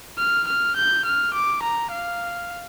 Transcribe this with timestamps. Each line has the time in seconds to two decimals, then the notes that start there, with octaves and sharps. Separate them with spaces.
0.18 F6
0.47 F6
0.76 G6
1.05 F6
1.34 D6
1.62 A#5
1.92 F5